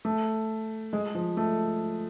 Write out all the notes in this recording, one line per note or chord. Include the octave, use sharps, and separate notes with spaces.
A3
G#3
F3
A3